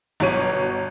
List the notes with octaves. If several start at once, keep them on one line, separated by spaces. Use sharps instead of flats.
G1 B2 F#3 C#5 D#7